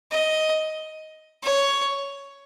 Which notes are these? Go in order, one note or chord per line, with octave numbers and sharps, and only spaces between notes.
D#5
C#5